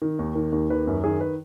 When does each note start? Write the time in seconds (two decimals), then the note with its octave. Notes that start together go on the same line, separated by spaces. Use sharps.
0.02 D#3
0.19 D#2
0.35 D#3
0.52 D#2
0.70 D#3 B4
0.87 F#2
1.04 D#3 G#4
1.21 B4